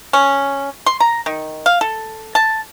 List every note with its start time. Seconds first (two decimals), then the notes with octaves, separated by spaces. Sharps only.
0.13 C#4
0.86 C6
1.00 A#5
1.26 D#3
1.66 F5
1.81 A4
2.35 A5